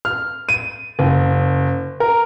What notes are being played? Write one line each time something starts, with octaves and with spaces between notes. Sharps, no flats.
F6
D#7
F#1
A#4